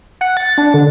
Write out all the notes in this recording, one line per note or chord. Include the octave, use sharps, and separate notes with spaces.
F#5
A6
D4
D3